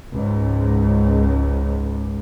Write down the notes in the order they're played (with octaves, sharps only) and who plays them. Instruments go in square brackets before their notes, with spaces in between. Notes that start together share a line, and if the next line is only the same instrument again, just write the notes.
[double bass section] C#2 G#2